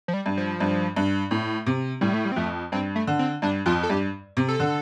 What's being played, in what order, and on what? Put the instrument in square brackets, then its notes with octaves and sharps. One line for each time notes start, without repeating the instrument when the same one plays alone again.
[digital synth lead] F3
G3
[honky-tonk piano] G2
[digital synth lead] F3
[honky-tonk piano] G2
G2
A2
C3
[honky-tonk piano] A2 [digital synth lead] G3
[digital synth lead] A3
G3
C4
[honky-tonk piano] F2 [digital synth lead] A3
[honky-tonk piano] G2 [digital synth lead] C4
[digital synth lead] A3
[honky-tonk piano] D3
[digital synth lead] C4
[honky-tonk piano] G2 [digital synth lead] D4
[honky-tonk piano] F2 [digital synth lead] F4
[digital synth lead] A4
[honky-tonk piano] G2 [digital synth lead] G4
[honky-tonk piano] C3
[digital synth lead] A4
[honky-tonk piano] D3